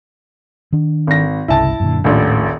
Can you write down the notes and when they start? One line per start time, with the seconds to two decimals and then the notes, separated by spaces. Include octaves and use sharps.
0.73 D#3 D4
1.07 G#1 A#6
1.48 G1 C2 C#3 E4 A5
1.80 F#2 A#2 D3
2.04 D#1 A#1 A2